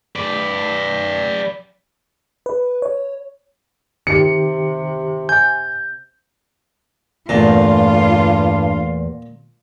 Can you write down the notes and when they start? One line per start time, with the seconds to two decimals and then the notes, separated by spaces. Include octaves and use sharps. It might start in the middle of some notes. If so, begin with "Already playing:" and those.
0.16 B4 D5
2.46 B4
2.82 C#5
4.07 C3 D#3 G4 C#7
5.29 G#5 G6
7.29 E2 G2 A#2 A3 F4